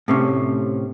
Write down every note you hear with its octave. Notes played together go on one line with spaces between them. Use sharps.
A2 C3 C#4